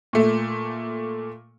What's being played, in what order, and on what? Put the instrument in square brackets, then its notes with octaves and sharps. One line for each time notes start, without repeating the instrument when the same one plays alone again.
[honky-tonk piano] A#2 A3